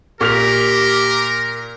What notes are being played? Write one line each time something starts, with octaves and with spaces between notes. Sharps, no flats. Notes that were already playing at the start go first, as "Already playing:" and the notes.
A#2 G4 A#4 F6 F7